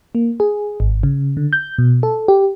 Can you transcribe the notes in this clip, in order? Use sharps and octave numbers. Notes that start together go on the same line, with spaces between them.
A#3
G#4
G#1
C#3
D3
G6
B2
A4
G4